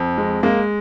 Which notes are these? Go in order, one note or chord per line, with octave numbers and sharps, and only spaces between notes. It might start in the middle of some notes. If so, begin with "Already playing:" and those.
Already playing: F2
G#3
G#3 A#3